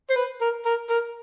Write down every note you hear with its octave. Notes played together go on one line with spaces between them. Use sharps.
C5
B4
A#4
A#4
A#4